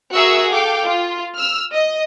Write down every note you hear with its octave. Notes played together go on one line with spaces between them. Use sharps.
F#4 G#4 A#4 E5 C#6 E6
A4 F5 G5 D6
F4
E6 F6
D#5